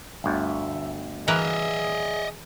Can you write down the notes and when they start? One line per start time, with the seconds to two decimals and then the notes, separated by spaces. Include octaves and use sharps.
0.24 G1 D2 E5
1.28 E3 G#4 A#4 B4 D#5 E5